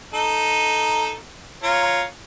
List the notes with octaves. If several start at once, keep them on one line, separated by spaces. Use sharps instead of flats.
D#4 A4
F4 C#5 A#5